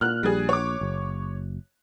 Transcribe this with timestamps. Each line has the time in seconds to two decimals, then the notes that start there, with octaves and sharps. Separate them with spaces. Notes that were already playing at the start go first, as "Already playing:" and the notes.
0.01 A#2 F6 F#6
0.23 A#1 G3 G#4
0.49 C#5 D6
0.81 F#1